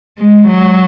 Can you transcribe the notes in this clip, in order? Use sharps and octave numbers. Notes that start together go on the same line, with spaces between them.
G#3
F#3